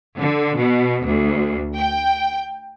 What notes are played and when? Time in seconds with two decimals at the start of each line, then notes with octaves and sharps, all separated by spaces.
0.17 D3
0.58 B2
1.04 D2
1.78 G5